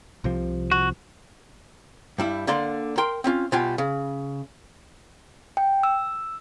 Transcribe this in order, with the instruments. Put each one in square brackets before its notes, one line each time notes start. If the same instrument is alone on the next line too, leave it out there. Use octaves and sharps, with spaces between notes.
[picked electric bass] C2 C3 F3
[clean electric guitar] F#4
[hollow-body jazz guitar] G2 G3 E4
D3 A#3 D5 C6
A#4 G5 C6
C4 C#4 F4
B2 G3 F4 G5 G#5
C#3
[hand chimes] G5
E6